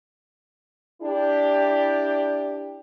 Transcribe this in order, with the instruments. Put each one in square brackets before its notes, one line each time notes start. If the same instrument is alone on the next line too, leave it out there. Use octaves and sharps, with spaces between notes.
[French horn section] D4 E4 G4